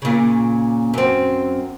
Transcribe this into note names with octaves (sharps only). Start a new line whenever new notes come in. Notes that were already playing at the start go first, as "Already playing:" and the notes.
A#2 C#3
F#2 C4